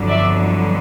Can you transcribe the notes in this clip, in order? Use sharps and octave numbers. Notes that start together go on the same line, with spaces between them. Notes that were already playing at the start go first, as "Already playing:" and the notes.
Already playing: G1 F2 D3 F#3
D5 E5